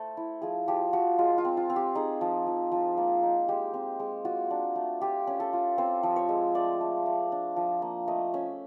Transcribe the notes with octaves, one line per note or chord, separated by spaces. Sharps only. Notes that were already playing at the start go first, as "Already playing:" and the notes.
Already playing: A3 A4 C5
E4
F3 G#4
F3 G4
F3 F#4
G#3 F4
F4
C4
F4
C4
G4
D#4 G#4
F3
F3
F3
A#3
D#4
G#3 G4
C4
G#3
F4 F#4
D4
A3
F4 G4
C#4
A4
F4
C4 C5
F3
C#5
G#3
A3 D5
A3
A3
D4
F3
A#3
A3 D#5
C#4 E5